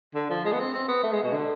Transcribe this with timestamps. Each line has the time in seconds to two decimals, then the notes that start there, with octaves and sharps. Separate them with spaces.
0.15 D3
0.30 F3
0.45 G#3
0.52 B3
0.60 C4
0.74 C4
0.88 B3
1.03 A3
1.12 G#3
1.23 B2
1.33 D3